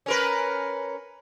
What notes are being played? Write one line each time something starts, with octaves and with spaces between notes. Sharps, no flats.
C#4 A#4 B4